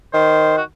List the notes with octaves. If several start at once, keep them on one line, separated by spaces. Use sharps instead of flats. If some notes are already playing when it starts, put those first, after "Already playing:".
D#3 C5
F#4